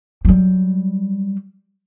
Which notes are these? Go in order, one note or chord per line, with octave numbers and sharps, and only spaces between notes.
F#3 G3